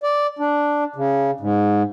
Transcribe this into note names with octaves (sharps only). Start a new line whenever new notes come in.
D5
D4
C#3
G#2